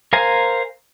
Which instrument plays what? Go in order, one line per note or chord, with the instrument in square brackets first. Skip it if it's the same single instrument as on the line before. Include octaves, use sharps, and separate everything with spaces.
[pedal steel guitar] A#4 C5 F5 G#5 A#5